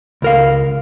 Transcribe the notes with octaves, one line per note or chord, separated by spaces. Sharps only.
C#2 A#4 F5